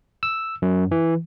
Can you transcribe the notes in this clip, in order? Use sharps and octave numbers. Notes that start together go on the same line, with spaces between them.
E6
F#2
E3